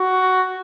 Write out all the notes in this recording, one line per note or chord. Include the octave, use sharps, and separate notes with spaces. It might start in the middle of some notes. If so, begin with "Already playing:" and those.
Already playing: F#4